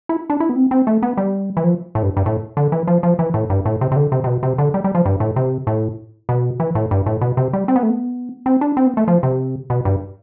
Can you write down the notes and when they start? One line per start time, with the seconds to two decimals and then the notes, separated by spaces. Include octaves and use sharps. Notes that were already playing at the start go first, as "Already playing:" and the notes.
0.09 E4
0.30 D4
0.40 E4
0.49 B3
0.56 C4
0.71 C4
0.87 A3
1.03 B3
1.17 G3
1.57 E3
1.64 F3
1.95 A2
2.03 G2
2.17 G2
2.26 A2
2.57 D3
2.72 E3
2.88 F3
3.03 F3
3.19 E3
3.34 A2
3.50 G2
3.65 A2
3.81 C3
3.92 C3
3.96 D3
4.12 C3
4.24 C3
4.27 B2
4.43 C3
4.58 D3
4.74 G3
4.84 G3
4.95 F3
5.05 G2
5.20 A2
5.36 C3
5.67 A2
6.29 B2
6.60 E3
6.75 A2
6.91 G2
7.06 A2
7.21 B2
7.37 C3
7.53 G3
7.68 C4
7.76 B3
7.83 A3
7.90 B3
8.46 C4
8.61 D4
8.77 C4
8.87 B3
8.97 A3
9.08 F3
9.23 C3
9.70 B2
9.85 G2